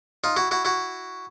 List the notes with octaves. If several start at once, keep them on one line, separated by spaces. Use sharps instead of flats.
D#4 F4
E4 F#4
E4 F#4
E4 F#4